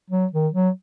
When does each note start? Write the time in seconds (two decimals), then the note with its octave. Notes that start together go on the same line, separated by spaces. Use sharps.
0.11 F#3
0.33 D#3
0.54 F#3